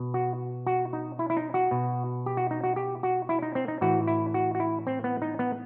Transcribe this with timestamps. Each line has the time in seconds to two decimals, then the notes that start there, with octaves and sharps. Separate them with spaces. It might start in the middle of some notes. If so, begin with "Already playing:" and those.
Already playing: B2
0.14 F#4
0.67 F#4
0.93 D#4
1.19 E4
1.30 E4
1.37 D#4
1.54 F#4
1.71 B2
2.26 G4
2.37 F#4
2.51 D#4
2.64 F#4
2.76 G4
3.03 F#4
3.29 E4
3.42 D#4
3.55 C4
3.68 D#4
3.81 A2 E3 F#4
4.08 E4
4.34 F#4
4.55 F#4
4.60 E4
4.87 C4
5.04 B3
5.22 D#4
5.39 B3